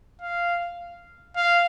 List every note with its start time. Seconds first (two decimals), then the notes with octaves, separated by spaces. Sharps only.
0.21 F5
1.36 F5